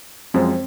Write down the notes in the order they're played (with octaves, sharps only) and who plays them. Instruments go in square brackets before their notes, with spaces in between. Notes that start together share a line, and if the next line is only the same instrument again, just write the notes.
[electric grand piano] F#2 F3 G#3 [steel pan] C4